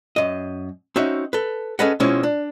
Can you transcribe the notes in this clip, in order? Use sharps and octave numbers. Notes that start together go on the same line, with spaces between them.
F#2 D#5
C4 C#4 D#4 F#4 E5
A4 B4
C#4 G#4 A4 B4 D#5 F#5
B2 F3 G#3 C4 C#4 E4
D4